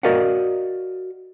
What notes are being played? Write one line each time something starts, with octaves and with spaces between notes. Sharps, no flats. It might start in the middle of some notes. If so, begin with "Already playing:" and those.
F#4 A#4 D5 D#5 F5 F#5